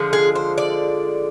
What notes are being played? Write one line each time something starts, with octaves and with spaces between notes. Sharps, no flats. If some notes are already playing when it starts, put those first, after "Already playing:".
Already playing: D3 F3 G#3
G#4
C5
D5